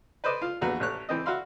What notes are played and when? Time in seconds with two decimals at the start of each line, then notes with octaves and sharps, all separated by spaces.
0.24 B4 C5 D5 D#5
0.42 F4
0.61 A#1 E2 F#4 B4 A#5
0.80 A1 C#5 F#6
1.09 E3 C4 D#5
1.26 F#4 E5 F5 B5 C6